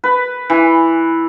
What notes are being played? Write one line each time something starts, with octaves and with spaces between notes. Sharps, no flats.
B4
E3